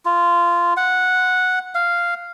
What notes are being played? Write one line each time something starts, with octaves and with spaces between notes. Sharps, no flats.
F4
F#5
F5